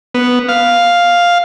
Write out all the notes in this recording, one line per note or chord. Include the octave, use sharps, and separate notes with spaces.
B3
F5